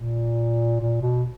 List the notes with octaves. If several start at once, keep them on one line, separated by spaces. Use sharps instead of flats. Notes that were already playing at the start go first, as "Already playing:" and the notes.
Already playing: A#2
A#2
B2